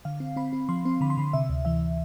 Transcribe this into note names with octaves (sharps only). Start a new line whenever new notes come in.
D3 F5
C4
C4 B5
C4
F3 C6
C4
D3 B5
C6
D3 B5
C3 E5
D2
E3 E5